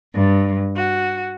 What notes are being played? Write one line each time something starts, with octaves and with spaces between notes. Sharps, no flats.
G2
F#4